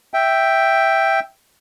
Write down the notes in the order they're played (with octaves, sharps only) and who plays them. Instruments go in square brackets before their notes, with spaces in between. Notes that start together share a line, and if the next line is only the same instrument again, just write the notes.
[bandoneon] E5 G5